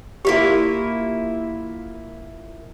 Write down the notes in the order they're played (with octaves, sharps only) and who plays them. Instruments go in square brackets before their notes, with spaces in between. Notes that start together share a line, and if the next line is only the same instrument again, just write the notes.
[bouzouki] A#3 E4 F4 [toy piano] G4